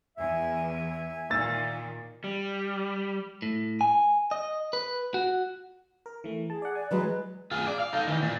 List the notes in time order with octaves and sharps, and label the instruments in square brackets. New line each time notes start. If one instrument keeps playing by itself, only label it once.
[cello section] E2 [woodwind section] E5 G#5
[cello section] A#2 D#3 [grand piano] A#3 E6 A6
[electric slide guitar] G3
[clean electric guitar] A2
G#5
D#5
B4
F#4
[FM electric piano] A#4
E3 A3
[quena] G#4 [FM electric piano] A5
[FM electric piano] D5 F#5
[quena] D5 [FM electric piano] G#5
[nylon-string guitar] E3 F#3 G#3 [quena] B4
[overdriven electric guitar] F4 G#4
D5
F5
D#4 A4
D#3 E3
A#2